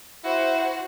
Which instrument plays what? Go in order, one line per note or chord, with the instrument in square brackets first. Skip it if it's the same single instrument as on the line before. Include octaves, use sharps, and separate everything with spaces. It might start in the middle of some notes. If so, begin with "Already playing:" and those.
[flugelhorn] E4 [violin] F#4 C5